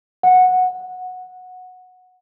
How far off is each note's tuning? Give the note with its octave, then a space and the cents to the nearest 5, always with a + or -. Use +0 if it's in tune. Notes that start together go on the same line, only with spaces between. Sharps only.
F#5 -10